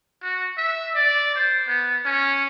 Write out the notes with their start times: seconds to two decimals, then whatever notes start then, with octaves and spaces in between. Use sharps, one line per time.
0.23 F#4
0.58 E5
0.95 D5
1.35 C5
1.68 B3
2.05 C#4